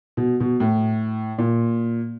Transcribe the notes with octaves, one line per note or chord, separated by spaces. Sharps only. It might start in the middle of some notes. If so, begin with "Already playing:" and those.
B2
B2
A2
A#2